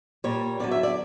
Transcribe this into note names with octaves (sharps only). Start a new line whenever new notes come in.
A#2 G3 C#5
E2 D3 F#3 D5
E5
D5